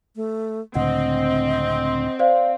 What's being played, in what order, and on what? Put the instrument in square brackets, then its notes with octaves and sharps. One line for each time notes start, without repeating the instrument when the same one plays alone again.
[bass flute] A3
[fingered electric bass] C#2 A2 D3 [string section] C4 [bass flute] D#5 [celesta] F#5
[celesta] C5 D5 F5